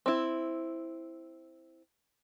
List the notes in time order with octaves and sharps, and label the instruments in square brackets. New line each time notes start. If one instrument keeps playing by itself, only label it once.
[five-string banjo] C4 E4